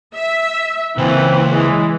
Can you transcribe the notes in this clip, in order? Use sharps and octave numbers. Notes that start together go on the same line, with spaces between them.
E5
C#2 E3 A#3 C4 C#4
E3 G#3 E4